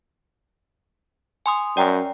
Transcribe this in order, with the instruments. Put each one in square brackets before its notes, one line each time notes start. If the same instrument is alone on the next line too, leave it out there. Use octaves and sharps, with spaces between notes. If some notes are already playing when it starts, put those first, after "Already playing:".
[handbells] G#5 C6 D#6
[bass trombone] F#2 [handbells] D5 G5 A#5